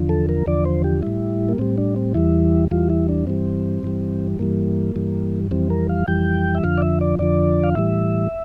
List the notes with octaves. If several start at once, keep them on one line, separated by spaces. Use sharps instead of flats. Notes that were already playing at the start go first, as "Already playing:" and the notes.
Already playing: E2 D3 F3
A4
A#4
E2 D3 F3 D5
C5
G4
A2 G3 E4
A#3
A2 G3 C4
D4
C4
E2 E3 G3 E4
E2 E3 G3 F4
E4
D4
G2 E3 G3 C4
G2 E3 G3
G2 E3 G3 A#3
G2 E3 G3
F2 E3 G3 C4
A#4
F5
F2 E3 G3 G5
E5
F2 D3 F3 F5
D5
E5
D5
F2 D3 F3 D5
F5
A2 E3 G3 E5